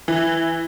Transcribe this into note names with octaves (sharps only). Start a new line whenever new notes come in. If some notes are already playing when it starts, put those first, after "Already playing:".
E3